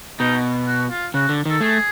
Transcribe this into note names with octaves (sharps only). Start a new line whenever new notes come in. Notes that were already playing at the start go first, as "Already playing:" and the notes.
B2 D#4
F#4
F4
C#3 F#4
D3
D#3 A4
A3 G#4